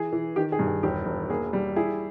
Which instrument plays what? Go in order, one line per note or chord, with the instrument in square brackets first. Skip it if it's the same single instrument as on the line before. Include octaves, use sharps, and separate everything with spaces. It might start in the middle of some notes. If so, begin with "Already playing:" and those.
Already playing: [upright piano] E3 G#4
E3
D#3 G4
G#4
G2
G#4
E1 G4
E1
A#3 G#4
G3
E4 G#4